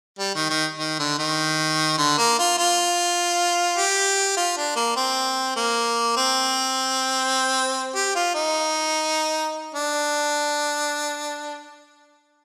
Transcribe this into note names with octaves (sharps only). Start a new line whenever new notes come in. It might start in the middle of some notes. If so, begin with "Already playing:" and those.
G3
D#3
D#3
D#3
D3
D#3
D3
A#3
F4
F4
G4
F4
D4
A#3
C4
A#3
C4
G4
F4
D#4
D4